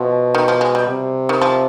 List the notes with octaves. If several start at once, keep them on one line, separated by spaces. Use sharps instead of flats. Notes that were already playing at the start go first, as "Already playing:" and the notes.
Already playing: B2 F3
D#3
F3
G#3
G3
C3
D#3
F3